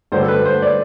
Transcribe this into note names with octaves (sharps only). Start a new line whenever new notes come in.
G2 D3 F#3 C5
A4
B4
C5
D5